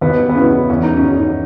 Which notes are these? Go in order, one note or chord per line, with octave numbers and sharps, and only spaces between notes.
D#2 B3
B3
C#3 E3 C#4
E2 C#4
D#4
C#4
D#3